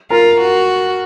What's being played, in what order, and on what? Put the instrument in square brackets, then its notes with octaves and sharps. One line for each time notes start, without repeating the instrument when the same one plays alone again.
[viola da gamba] F4 [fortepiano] A#4
[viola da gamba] F#4